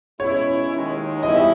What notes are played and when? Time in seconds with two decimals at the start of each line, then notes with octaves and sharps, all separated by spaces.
0.20 B2 G#3 C#4 E4 C#5
0.71 D#2 D#3 G#3
1.23 E2 B2 G3 C#4 E4 D#5
1.35 E5